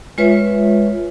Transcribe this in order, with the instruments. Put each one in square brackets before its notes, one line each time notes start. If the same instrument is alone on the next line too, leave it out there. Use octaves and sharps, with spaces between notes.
[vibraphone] G#3 F4 B4 C#5 E5